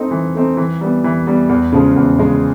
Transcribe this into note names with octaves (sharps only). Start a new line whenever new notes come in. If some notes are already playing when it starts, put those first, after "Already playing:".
Already playing: A3 C4 D#4
E3
A3 C4 D#4
E3
G3 B3
E3
G3 B3
E2
C#3 F3 G#3
E2
C#3 F3 G#3